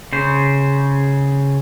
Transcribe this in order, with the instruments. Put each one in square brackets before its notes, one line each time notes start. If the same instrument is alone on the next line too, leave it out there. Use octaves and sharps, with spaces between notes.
[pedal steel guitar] C#3 C5